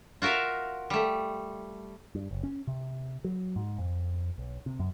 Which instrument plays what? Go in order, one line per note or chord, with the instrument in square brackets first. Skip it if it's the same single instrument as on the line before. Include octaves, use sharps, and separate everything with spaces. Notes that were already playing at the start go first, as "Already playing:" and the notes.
[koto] F4 F#4 A#4 E5 F5
G3 A3
[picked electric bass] G2
F#1
C#4
C3
F#3
G#2
F2
B1
C3
F#2